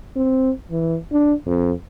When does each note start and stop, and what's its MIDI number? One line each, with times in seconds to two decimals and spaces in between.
0.16 0.51 60
0.71 0.97 52
1.12 1.33 62
1.46 1.71 41